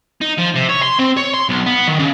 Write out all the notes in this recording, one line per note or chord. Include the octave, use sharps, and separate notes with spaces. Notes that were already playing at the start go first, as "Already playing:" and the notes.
D#4
F3
C3
C#5
C6
C4
C#5
C6
B1
B3
D#3
C#3